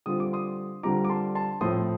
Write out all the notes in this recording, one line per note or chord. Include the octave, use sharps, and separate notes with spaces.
D3 G3 C4 F4 D#6
D6
C6 D#6
D3 G3 C4 F4 A#5 D6
D6
A5 C6
A5 C6
A2 F3 A3 C4 C6 D#6